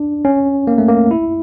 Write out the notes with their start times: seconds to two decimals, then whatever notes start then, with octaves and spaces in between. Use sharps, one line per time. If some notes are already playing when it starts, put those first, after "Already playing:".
Already playing: D4
0.25 C#4
0.67 A#3
0.78 A3
0.89 A#3
1.11 E4